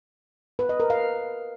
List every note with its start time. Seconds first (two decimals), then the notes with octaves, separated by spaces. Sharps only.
0.59 B4
0.69 D#5
0.80 A#4
0.90 F5